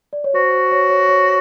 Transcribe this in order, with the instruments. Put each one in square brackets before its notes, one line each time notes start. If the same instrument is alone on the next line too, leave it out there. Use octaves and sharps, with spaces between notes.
[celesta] D5
C#5
[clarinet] F#4 [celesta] C5
[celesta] C#5
C#5
C#5